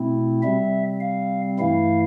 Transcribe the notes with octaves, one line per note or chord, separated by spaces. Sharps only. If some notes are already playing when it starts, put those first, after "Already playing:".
Already playing: B2 A3 C4 E4
C3 G3 C4 E5
F5
G2 E3 A3 E4 F5